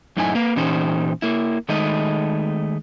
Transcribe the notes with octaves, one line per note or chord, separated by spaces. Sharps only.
F#2 A2 D#4 E4 G4 G#5
A#3 B4 F5
A#2 E3 C#4 D#4 G4 C5
A#3 E4
D#3 G#3 A3 D#4 D#5